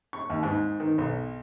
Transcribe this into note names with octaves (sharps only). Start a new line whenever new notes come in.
C#6
D#2
G#2
D#3
B1